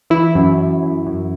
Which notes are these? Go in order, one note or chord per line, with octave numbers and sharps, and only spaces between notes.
E3 E4
F#2
F#2
F#2
F#2